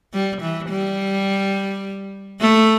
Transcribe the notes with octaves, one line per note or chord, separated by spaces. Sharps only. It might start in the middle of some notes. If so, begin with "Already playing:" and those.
G3
E3
G3
A3